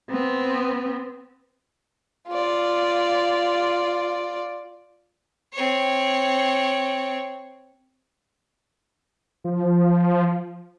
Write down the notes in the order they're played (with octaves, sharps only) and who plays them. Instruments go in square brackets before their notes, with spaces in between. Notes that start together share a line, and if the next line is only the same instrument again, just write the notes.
[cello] B3 C4
[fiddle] F4 D5
C4 C#5
[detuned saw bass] F3